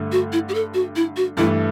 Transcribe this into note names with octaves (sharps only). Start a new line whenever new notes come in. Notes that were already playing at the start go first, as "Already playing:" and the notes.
Already playing: G2 D3 A3
F#4
E4
G4
A4
F#4
E4
F#4
G2 E3 A3 E4